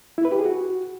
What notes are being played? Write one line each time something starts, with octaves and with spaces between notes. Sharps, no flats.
E4
B4
G4
G#4
F#4